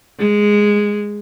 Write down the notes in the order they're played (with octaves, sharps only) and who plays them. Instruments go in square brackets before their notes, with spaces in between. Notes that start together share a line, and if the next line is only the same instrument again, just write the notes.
[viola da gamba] G#3